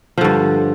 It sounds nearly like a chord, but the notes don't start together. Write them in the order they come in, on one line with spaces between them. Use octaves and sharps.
F3 D3 G2